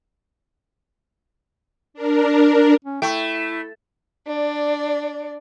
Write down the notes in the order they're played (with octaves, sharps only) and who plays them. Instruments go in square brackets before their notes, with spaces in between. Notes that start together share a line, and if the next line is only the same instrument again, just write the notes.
[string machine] D4 A#4
[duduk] C#4
[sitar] A3 [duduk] E4 [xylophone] G5 C#6
[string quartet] D4 D5